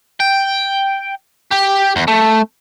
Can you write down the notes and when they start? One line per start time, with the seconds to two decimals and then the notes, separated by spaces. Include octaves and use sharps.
0.20 G5
1.51 G4
1.96 E2
2.08 A3